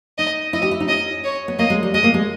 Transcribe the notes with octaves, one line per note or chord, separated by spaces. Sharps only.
D#4 D#5
E4 D#5
G4
E4
D#4
C#4 D#5
C#5
B3
A#3 D#5
G#3
G3
G#3 D#5
A#3
G#3